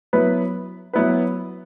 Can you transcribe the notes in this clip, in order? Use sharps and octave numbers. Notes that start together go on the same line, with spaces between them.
F#3 B3 E4 B4
F#3 B3 E4 B4